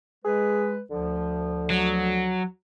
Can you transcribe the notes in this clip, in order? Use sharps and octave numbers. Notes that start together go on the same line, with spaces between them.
G#3 G#4 B4
D2 D3 F3
F#3